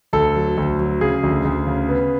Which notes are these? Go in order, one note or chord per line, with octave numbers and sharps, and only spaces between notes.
D2 A4
F#3
D2
F#3
C#3 G#4
D2
D2
C#3
B3